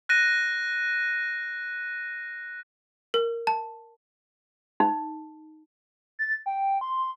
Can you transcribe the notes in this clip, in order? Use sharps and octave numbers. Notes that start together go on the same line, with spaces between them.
F#6 A#6 D#7
A#4
A5
D#4
A6
G5
C6